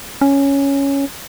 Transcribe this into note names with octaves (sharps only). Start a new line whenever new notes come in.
C#4